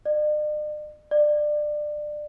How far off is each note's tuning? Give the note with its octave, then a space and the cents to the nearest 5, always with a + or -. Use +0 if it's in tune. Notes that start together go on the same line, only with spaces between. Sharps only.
D5 +45
D5 +25